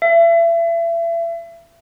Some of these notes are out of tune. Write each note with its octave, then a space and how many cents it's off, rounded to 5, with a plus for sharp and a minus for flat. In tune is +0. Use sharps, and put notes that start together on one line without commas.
E5 +35